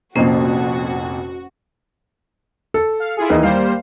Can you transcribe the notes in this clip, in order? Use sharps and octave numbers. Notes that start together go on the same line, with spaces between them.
F1 F2 A#2 C#4 F#4 C5 D#5
A4
F5
E4 F4 G#4
D#2 E3 D#5
G3 A#3 C5 F5